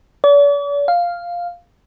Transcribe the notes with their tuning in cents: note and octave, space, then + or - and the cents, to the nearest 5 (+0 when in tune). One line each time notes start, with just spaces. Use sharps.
D5 -45
F5 +0